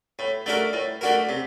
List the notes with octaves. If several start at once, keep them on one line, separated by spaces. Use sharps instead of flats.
A2
A3 D4 F#4 A#4
A2
A3 D4 F#4 A#4
C3